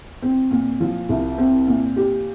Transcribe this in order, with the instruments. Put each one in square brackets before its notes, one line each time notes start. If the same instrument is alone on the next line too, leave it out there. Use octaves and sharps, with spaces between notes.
[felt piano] C4
A#2
F3
C2
C4
A#2
G4